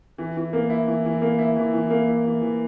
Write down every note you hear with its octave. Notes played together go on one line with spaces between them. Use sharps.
E3
E3
A#3
E4
E3
E3
A#3
E4
E3
E3
A#3
E4
E3
E3